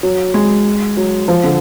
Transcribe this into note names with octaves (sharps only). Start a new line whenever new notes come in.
F#3
G#3
F#3
F3
D3